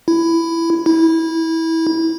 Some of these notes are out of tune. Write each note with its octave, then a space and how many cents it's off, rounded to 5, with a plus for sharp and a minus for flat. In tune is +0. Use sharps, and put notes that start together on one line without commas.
E4 +10
E4 -20